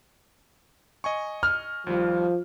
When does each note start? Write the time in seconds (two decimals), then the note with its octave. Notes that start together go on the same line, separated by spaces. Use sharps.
1.04 D#5 G#5 C#6
1.43 F6
1.87 D#2 F3 G3